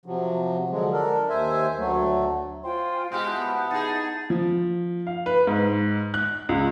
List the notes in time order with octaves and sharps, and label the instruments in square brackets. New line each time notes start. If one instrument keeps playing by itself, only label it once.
[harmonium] C3 F3 F#3
D3 F3 F#3 G#3
D4 A4 A#4
D#2 C5 E5 G#5
D2 F#3 A3
[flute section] F4 G#5 [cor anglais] C5 [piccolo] G5
[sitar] B2 F#4 G4 [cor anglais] G#3 [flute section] C6 F6 [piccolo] G6
[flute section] E4 F#5 A5 [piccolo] F#6
[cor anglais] B3
[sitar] D#4 G#4 [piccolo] A6
[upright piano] F3
F5
B4
G#2
F#6
C#2